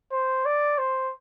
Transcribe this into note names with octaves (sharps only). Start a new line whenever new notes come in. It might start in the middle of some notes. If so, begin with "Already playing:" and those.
C5
D5
C5